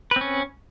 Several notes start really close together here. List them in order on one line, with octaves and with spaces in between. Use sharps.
B4 C4 C#4